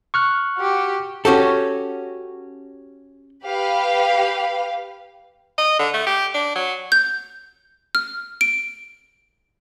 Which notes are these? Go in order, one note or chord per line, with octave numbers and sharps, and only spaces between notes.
C#6 F6 F#6
F#4 G4
C#4 F#4 G4 A4
G4 B4 F5
D#5
D3
A3
G4
D4
F#3
G6
F6
D7